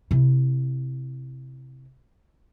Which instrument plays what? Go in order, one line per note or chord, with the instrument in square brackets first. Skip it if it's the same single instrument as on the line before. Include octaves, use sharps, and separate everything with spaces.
[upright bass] C3 E4